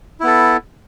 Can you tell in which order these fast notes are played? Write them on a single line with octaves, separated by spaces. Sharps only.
E4 B3 A4